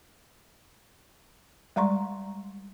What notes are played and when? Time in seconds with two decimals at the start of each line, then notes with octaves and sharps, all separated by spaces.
1.76 G3 G#3 D5 A#5 C6 C#6